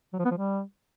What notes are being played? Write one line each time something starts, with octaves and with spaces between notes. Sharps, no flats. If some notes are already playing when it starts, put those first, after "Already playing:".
F#3
F3
B3
F3
G3